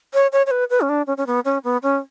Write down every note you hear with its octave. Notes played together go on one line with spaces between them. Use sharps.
C#5
C#5
C#5
B4
B4
C#4
D4
C#4
C#4
B3
C#4
B3
C#4